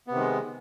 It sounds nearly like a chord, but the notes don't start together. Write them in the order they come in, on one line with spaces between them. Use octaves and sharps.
B3 C3 D#3 G#3